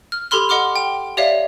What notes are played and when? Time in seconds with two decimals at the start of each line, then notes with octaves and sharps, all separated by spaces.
0.12 F6
0.31 G4 A4 B5 C6 F6
0.49 D#5 F#5 C6 D6 F6
0.76 G5
1.17 G4 C#5 D5 E5 F5